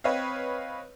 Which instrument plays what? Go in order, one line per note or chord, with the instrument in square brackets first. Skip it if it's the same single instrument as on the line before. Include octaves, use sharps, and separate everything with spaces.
[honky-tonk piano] C4 B4 C#5 D#5 F5